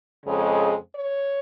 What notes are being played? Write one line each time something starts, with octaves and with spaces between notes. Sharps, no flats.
F2 C#3 G#3
C#5